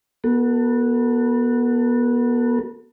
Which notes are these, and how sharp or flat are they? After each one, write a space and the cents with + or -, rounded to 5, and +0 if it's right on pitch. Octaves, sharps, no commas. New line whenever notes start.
B3 -30 F#4 +0 A4 +30